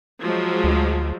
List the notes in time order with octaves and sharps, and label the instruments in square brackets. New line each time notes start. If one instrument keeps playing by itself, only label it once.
[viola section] F3 F#3 G#3
[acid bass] D2